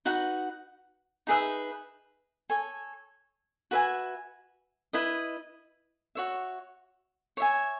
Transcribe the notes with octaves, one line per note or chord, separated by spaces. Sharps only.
D#4 F#4 B4 F#5
D#4 G#4 B4 E5
A4 C#5 G#5
F#4 B4 E5 G#5
E4 B4 D#5
F#4 C#5 E5
C#5 E5 G#5